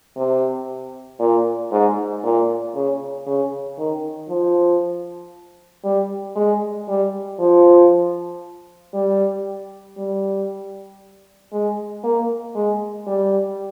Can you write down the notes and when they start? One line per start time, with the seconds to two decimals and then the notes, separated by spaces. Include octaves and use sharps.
0.17 C3
1.19 A#2
1.72 G#2
2.23 A#2
2.75 C#3
3.27 C#3
3.78 D#3
4.29 F3
5.84 G3
6.36 G#3
6.88 G3
7.40 F3
8.94 G3
9.97 G3
11.52 G#3
12.04 A#3
12.55 G#3
13.07 G3